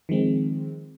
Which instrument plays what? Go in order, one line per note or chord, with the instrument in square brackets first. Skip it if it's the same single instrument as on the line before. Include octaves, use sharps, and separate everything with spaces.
[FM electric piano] D#3 F3 G#3 C4